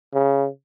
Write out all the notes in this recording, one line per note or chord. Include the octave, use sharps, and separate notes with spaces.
C#3